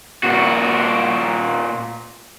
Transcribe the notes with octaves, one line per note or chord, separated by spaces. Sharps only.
A#2 F#4